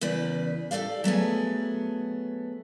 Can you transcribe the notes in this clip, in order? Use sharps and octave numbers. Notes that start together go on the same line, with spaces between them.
E2 C#3 B4 D5
G4 A4 C5 D5 F5
F#3 A3 B3 G#4